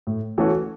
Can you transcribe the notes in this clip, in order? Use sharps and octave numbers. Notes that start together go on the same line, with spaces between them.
A2
E3 A3 C#4 F#4